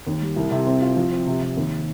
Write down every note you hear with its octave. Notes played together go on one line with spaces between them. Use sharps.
D#2
G3
C2
C3
C4
F4
F3
C4
C3
C3
D#2